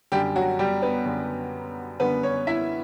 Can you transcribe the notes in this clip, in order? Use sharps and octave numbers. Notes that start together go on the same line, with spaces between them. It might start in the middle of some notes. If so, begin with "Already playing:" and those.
F#2 D3 G3 G4
F#3 F#4
G3 G4
B3 B4
F#2 D3 G3
F#2 D3 G3 B3 B4
C#4 C#5
E4 E5